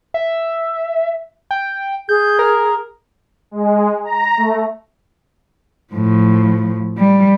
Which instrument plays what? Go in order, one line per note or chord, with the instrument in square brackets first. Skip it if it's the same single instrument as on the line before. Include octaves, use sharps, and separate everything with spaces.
[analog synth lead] E5
G5
[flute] G#4 [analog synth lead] G6
[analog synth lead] A#4
[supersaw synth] G#3
A#5
A3
[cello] A2 F3
G3